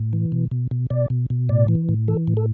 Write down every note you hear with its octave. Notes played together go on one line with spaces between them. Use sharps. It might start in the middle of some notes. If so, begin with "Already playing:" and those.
Already playing: A2
E3
B2
B2
B2
B2 D5
B2
B2
A2 D5
E3
A2
E3 A4
A2
A4